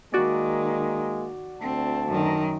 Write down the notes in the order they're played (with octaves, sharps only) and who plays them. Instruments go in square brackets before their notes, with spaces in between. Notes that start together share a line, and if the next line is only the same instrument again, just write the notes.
[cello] D#3 [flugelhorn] G#3 [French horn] A#3 [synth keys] F#4 D5
[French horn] D2 [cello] C4 [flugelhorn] A5
[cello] F#2 D#3